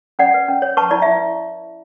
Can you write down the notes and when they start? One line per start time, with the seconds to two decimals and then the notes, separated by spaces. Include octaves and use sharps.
0.19 C#4 D5 F#5
0.34 B4
0.48 C#4
0.62 C#5
0.77 B4 A5 C#6
0.91 E4 D5
1.02 E4 E5